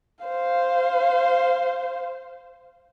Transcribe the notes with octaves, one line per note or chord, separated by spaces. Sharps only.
C5 F5